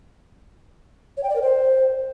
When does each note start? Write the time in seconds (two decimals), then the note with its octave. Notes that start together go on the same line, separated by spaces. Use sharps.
1.17 C#5
1.23 G5
1.29 D5
1.36 A#4
1.42 C5